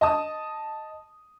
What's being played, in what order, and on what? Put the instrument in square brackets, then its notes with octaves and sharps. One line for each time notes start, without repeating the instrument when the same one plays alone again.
[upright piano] D#5 A5 D#6